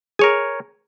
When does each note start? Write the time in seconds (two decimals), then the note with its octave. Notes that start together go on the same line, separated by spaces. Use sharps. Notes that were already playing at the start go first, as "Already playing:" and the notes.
0.19 G#4 A#4 C#5 G#5